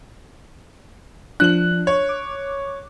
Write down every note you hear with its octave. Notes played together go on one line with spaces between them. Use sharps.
F3 D4 F#6 F#7
C#5
D6